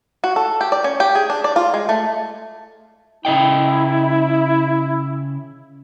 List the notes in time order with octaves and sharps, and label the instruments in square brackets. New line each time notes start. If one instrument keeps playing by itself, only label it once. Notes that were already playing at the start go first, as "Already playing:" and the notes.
[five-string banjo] F#4
A4
G4
D5
C#4
G4
G#4
D4
D5
F4
G#3
A3
[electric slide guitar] C#3 D#5 G5 [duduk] E4